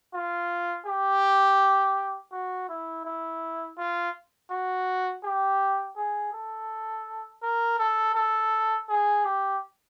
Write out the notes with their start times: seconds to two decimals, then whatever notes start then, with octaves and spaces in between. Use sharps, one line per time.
0.14 F4
0.86 G4
2.31 F#4
2.69 E4
3.05 E4
3.77 F4
4.50 F#4
5.24 G4
5.96 G#4
6.33 A4
7.42 A#4
7.79 A4
8.15 A4
8.89 G#4
9.24 G4